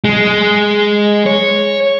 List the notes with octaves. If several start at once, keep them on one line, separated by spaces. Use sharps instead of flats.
G#3
C#5